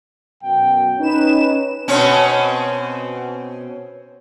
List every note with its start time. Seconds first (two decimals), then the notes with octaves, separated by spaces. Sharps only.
0.44 F#2 B2 G5
0.99 C#4 D#4 B4 C#5 E7
1.88 B2 C4 C#4